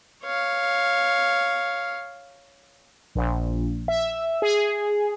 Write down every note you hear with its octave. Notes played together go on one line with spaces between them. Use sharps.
C#5 F5
A#1
E5
G#4